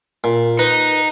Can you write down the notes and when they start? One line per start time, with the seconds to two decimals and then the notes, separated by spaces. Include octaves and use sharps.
0.24 A#2
0.59 D#4 B4